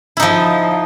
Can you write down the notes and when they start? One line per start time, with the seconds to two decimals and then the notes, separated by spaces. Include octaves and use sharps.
0.17 E4
0.20 D#4
0.22 F3